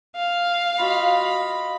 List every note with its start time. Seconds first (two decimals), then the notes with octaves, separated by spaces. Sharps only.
0.16 F5
0.79 F4 F#4 D#5 B5